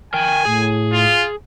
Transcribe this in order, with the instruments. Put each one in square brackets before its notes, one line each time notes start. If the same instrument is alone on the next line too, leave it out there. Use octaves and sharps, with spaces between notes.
[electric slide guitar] A#4 G5 [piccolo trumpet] G#5
[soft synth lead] A2 [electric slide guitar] G#4
[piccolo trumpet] F4